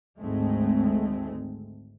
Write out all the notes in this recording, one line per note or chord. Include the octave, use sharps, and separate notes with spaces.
G#1 D2 G#2 G#3 A3 C4